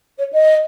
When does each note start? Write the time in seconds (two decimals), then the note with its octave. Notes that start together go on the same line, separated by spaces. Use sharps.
0.18 C#5
0.32 D#5